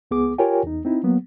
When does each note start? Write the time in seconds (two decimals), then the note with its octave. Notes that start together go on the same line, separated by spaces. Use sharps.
0.11 C#2 B3 G#4 D6
0.38 F4 G4 A#4 C#5 G5 G#5
0.64 E2 D#4
0.85 C4 D#4 E4
1.03 F#3 A#3 B3